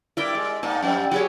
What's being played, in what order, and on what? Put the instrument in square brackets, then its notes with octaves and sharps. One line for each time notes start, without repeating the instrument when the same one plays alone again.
[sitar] G2 E4 [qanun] A#4 D5 G5
[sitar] G#3
[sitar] G2 A#3 D#4 [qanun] A5
[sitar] F2 G3
[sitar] F#3 [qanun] G4 G#4 C#5